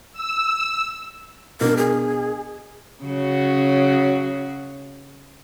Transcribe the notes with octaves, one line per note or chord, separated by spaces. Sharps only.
E6
B2 D4 A#4
G#4
C#3 F#3 F#4